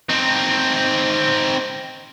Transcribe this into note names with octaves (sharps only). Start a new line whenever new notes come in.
C4 D#4